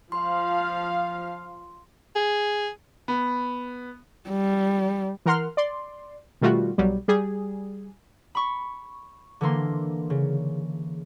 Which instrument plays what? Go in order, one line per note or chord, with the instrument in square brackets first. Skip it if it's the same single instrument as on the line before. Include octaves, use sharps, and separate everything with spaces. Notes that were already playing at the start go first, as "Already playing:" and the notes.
[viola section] F3 F5 [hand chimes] C6
[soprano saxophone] G#4
[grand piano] B3
[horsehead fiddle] G3
[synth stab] E3 A#4 F#5 C6 F6
D5 C6
B2 D#3 G3 A3 F4 F#4
B1 F#3 G3
G3 G#4
[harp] B5 C#6
D3 E3 A#3 C6
C#3